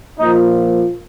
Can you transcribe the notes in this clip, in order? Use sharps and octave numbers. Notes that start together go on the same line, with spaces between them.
A#2 F3 D#4